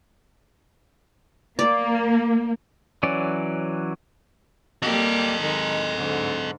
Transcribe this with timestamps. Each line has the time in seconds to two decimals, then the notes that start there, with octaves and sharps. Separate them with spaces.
1.59 A#3 D5
3.03 E3 F#3 C#4 D5
4.82 G3 A#3 G4 A4 D#5
5.39 D#3 G#3 D#4
5.96 G#2 D3